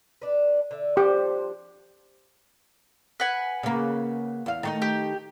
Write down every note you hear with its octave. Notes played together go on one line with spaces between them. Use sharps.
D4 B4
D3 E5
F3 D4 G4 C5
B4 F#5 G#5
C#3 A#3
E2 F5
D#3 A3 D#4
G4